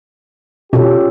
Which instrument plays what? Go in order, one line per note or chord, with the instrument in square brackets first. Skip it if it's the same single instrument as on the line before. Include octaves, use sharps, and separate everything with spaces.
[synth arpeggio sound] B2 [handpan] C#4 F4 A4 [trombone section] G4